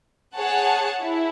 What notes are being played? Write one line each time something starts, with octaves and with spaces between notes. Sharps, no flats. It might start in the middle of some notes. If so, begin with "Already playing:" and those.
G#4 C#5 F#5 A5
E4